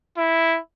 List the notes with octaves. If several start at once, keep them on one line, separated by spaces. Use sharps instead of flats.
E4